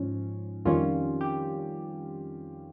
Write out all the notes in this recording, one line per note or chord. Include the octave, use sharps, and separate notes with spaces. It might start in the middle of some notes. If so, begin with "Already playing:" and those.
Already playing: G#2 F3 C#4
F2 D#3 G3 C#4 F4
G4